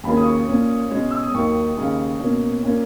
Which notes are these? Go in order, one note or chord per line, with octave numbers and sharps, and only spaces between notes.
D#2 C#3 F#3 A#3 C#4 B5
D#6
C#6
A#2 A#3 C#4
B2 G#3 C#4
E6
D#6
D#2 D#3 F#3 A#3 C#6
D#2 C#3 G#3
B2 A#3 C#4
A#2 A#3 C#4